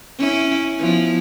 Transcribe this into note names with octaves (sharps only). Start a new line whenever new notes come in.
C#4 E4
F3 B3 E4